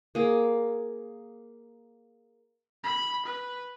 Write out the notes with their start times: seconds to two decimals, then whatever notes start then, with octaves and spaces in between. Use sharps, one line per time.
0.15 A#3 G#4
2.84 B5
3.26 B4